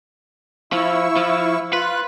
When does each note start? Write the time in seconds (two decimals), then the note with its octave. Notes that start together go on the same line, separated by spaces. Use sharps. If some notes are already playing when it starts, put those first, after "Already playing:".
0.72 F3 E4 C#6 E6
1.16 F3
1.73 F4 B4 F#6